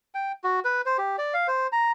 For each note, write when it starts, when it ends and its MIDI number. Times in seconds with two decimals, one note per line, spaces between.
0.15 0.32 79
0.44 0.60 66
0.65 0.81 71
0.86 0.97 72
0.98 1.16 67
1.18 1.34 74
1.34 1.47 77
1.48 1.67 72
1.72 1.92 82